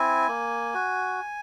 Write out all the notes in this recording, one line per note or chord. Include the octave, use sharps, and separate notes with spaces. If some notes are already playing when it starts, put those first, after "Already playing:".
Already playing: C4 E4 G#5
A#3
F#4